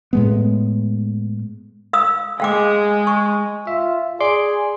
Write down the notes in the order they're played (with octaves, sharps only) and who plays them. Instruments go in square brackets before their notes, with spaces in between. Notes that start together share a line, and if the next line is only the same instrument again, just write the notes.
[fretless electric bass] A2 G#3 B3
[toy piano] F5 D#6 E6
[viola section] G#3 [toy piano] F5 G5 D6
[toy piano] C#6
[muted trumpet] F4 [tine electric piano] E5
[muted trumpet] G#4 [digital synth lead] D5 [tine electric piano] C6